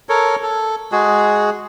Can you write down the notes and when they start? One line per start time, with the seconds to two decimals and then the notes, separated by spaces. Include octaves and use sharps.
0.09 A4 A#4 C#5
0.43 A4
0.92 G#3 F#4 G#4